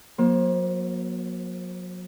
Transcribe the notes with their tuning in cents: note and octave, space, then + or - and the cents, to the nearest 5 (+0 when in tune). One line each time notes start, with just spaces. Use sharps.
F#3 -30 A#3 +30 C5 +25